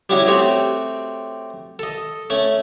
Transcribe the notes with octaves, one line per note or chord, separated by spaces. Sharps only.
G3 C#4 E4 F#4 G#4
A3 C4 F#4 G4 C#5
A4 D#5
A3 C#4